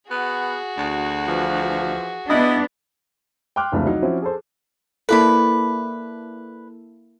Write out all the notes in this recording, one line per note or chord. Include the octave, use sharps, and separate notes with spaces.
B3 F#4 G#4
D2
E3 F3
B3 D4 E4 D#5
G5 C6 D6 F6 F#6
F1 C#2 C3 E3 A3 D4
F#3 D#4
F3 C4 C#4 E4 F#4
G#4 A4 C5
A#3 E4 A4 B4 D5 B5